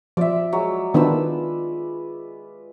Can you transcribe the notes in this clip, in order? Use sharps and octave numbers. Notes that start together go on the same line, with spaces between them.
F3 D5 E5
F#3 G#3
D#3 B3 D4 F4 B4 E6